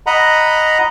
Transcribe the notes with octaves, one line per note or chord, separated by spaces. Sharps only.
D#5 F#5 A#5 B5